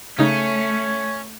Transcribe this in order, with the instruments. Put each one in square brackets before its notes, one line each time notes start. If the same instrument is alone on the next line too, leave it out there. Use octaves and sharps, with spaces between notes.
[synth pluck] C#3 D#4 [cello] A3 [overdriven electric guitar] C#4 [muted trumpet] C#5